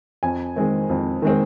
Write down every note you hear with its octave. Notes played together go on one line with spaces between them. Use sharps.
F2 G#5
D#3 G#3 C4
F2
D#3 G#3 C4